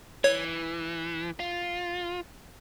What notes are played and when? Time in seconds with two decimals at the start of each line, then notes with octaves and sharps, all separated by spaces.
0.24 E3 C#5
1.40 F4